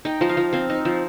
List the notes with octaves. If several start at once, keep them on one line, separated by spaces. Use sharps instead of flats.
D#4 G5
F3 D#5
F5
F3
C4 F5
D#4
F3